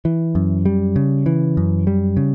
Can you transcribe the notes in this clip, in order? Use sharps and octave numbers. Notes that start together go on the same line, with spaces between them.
E3
F#2
G3
C#3
E3
F#2
G3
C#3